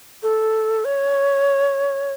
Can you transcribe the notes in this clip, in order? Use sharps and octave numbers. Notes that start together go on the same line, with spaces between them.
A4
C#5